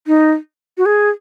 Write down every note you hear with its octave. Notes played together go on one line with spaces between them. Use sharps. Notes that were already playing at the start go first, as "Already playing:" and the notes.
D#4
F#4
G#4